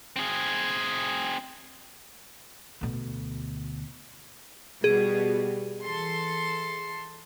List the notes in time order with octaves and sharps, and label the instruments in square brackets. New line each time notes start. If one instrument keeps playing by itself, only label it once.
[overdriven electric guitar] C4 G#4
[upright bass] D2 B2
[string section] B2 G3 [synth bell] G#4
[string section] E3 A4 C6